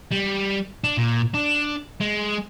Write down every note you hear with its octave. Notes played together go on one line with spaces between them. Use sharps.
G3
D4
A#2
D4
G#3